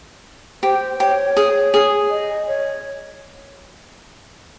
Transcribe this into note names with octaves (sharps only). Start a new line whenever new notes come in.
G4 C5
G4 C#5
G#4
G#4
D#5
C#5